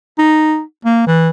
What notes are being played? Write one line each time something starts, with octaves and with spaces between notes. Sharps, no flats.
D#4
A#3
E3